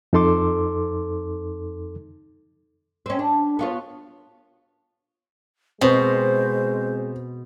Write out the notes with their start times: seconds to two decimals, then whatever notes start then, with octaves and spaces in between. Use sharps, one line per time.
0.13 F2 D#4 A4 C6 D6
3.06 C4 C#4
3.19 D4
3.59 B3 F4 C#5
5.81 B2 G#3 C4 C5